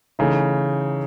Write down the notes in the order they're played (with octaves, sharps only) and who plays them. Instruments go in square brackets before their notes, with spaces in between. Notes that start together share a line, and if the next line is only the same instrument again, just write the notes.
[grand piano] C#3 [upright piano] E3 A3 D#4